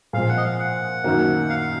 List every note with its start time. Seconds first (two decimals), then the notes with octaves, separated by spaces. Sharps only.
0.13 A#2 F3 G#3 C4 F4 F5
0.29 F#5
0.37 D#5
0.44 F5
0.60 F#5
1.04 F#2 D#3 F#3 A#3
1.50 F5